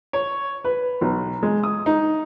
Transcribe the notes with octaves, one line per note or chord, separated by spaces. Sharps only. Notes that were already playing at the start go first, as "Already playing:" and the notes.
C#5
B4
B1
G#3
D#6
D#4